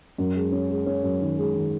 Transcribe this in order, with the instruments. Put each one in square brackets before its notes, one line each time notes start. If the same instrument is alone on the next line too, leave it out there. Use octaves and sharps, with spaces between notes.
[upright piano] F#2
G#3
C#4
G#3
C#4
F#2
D#3
G#3
D#3